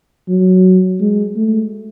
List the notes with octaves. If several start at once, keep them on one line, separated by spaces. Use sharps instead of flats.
F#3
G#3
A3